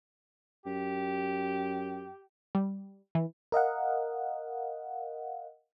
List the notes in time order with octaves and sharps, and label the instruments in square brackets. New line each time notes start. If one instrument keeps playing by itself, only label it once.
[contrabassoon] F#2 [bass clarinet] G4
[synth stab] G3
E3
[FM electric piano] A#4 D#5 F5 F#5